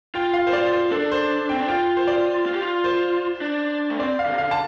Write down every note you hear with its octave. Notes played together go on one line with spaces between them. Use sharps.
F4 G5
F5
C5
F4 D5
C5
D4 A4
C5
C4 G5
D4
F4 G5
C5
D5
F4
G4
F4
C5
D4
A3
C4 D5
F5
D3
C3
D3 F5
A5